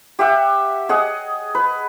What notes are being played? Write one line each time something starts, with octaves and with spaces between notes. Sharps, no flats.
G4 E5 F#5
G#4 D#5 F#5
B4